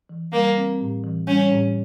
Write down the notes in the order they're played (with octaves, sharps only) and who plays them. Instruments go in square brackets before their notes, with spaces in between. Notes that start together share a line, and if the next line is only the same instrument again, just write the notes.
[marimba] E3
[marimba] G3 [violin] A#3
[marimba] C4
A2
E3
[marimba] G3 [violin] C#4
[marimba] A2